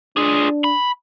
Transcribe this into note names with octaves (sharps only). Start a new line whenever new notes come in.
D4 F4 G#4
B5